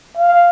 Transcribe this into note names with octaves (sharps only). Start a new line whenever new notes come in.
F5